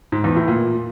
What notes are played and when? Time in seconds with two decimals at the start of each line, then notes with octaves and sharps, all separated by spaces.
0.12 G#2
0.24 E2
0.36 A2
0.48 A#2